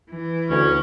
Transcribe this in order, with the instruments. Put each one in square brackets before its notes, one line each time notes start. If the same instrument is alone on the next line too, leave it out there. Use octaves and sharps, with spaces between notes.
[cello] E3
[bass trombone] D2 [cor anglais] C#4